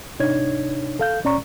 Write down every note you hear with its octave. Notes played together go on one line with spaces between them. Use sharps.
G#2 C3 D4 D#4 C#5 G#6
A4 F5 G6
A#2 C#4 D5 A#5 C#6